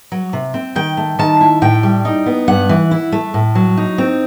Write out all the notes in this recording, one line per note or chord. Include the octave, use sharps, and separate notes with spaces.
F#3
C3
C4
D#3 G5
A3
D#3 A5
E4
A2 G5
G3
D#4
B3
G2 F#5
E3
E4
A3
A2
F#3
D#4
C4